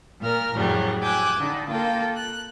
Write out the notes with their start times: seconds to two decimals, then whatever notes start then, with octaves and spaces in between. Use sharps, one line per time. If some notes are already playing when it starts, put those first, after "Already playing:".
0.21 A#2 A#4 F6
0.55 F2 A2 C#3 F#3 G3
1.03 G5 G#5 D6 E6 F#6 G#6
1.40 D3 D#4
1.69 A#3 F4 A4 G5
2.15 F#6